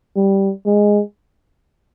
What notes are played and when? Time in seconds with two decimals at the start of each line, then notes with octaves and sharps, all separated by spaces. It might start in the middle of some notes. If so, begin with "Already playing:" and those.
0.16 G3
0.66 G#3